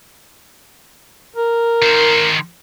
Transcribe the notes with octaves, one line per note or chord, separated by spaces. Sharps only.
A#4
D#3 C5